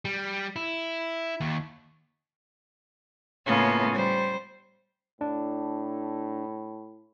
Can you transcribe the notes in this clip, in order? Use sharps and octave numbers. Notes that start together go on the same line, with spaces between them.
G3
E4
D#2
A2 C#3 A#3 B3 C#4 F4
G3 C5
A2 D4